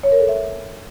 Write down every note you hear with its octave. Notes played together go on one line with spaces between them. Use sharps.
C#5
A#4
A4
E5